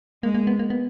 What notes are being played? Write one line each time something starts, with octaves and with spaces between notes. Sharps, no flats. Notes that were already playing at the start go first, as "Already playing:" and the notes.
G#3 A#3
A#3
B3
A#3
B3